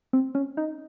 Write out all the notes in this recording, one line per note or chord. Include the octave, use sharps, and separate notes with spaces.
C4
C#4
D#4